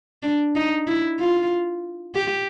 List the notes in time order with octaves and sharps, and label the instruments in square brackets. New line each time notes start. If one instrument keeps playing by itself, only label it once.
[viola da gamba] D4
D#4
E4
F4
G4